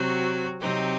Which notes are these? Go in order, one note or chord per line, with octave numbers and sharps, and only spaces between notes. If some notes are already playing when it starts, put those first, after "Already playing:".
Already playing: C3 F#3 C4 F#4
C3 F#3 C4 D#4 G4